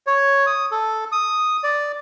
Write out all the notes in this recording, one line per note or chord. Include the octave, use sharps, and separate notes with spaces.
C#5
D#6
A4
D#6
D5